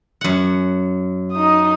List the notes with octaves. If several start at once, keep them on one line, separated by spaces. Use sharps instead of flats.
F#2 F#5
D#4 D#6